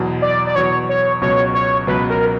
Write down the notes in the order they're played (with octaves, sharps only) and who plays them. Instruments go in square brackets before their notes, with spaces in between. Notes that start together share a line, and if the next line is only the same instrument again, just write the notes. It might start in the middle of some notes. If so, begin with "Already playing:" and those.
Already playing: [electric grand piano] E2 B2 F#3
[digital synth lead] D5
D5
[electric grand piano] E2 B2 F#3 [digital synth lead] C#5
[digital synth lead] C#5
[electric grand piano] C#2 B2 F#3 [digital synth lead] C#5
[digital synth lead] C#5
[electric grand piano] C#2 B2 F#3 [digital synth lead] B4
[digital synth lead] A#4